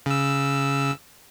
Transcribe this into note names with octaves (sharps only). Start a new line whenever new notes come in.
C#3 E6